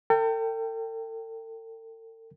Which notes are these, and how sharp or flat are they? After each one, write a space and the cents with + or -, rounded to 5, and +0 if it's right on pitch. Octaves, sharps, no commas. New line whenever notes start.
A4 +45 G5 +0